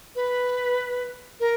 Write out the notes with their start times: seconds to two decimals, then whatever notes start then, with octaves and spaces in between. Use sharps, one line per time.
0.16 B4
1.40 A#4